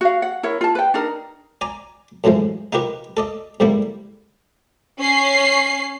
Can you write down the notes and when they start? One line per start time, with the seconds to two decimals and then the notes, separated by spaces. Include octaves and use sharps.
0.01 F#4 F5
0.22 F#5
0.43 E4 A#4 C#5
0.61 F4 A5
0.75 B4 G5
0.94 D4 D#4 A#4
1.61 D5 G#5 A#5
2.24 F#2 A2 E3 F3 G#3
2.73 D#4 F4 G4 A#4 B4
3.17 A4 D5 D#5
3.60 G#2 D3 G3 A#3 E4
5.00 C#4 C7